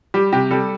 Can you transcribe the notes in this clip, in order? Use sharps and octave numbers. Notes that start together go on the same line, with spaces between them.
G3 G4
C3 G4
G3 A4